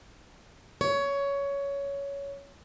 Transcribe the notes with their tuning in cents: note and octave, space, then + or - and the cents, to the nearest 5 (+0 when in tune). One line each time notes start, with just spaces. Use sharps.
C#5 +15